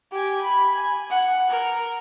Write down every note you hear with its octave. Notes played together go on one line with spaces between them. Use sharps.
G4 G#5
B5
G#5
F#5
A#4